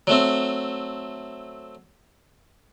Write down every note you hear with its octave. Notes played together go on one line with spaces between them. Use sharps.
F#3 A3 C4